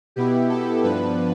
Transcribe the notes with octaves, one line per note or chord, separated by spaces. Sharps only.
B2 B3 E4 G4
A4
G2 F3 B3 D4 B4